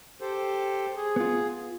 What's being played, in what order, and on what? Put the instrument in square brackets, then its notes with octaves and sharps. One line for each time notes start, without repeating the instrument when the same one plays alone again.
[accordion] G4 A4 C5
G#4
[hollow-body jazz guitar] B3 F4